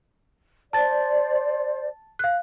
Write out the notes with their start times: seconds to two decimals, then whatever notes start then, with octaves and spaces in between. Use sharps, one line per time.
0.73 C5 D5 A5 A6
2.19 F5 F#6